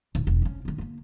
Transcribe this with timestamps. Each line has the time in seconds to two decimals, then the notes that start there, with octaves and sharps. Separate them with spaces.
0.15 D1
0.27 E1
0.42 C3 C#4
0.65 D3 B3
0.78 D3 A#3